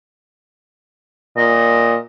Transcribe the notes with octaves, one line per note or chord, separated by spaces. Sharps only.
A#2 D#5